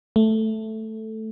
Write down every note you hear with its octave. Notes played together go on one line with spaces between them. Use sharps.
A3